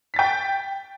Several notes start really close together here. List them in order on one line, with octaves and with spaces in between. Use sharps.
B6 A6 G5